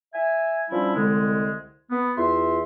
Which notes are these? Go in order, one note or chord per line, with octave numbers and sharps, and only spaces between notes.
E5 G#5
F3 G3 C#4 D4 E4
C2 D3 G#3
B3
E2 F4 E5 C6